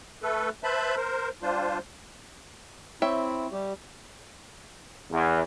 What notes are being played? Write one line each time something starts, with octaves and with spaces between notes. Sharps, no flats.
A3 A4 B4
B4 C5 E5 A5 B5
A#4 C5
G3 D4 F4 C5
C4 E4 C#5 E5 G5
G3 G4
E2